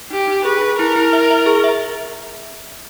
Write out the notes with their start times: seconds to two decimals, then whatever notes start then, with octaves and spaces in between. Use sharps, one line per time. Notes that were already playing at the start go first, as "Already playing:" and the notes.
0.10 D#4 G4
0.28 D#4
0.45 G#4 B4
0.62 G#4
0.79 E4 A#4
0.96 E4
1.13 E5
1.30 E5
1.46 G#4
1.64 E5